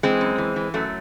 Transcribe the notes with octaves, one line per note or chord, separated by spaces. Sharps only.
E3 G#3 C4
F#2
E3
E3
F#2 F#3 A3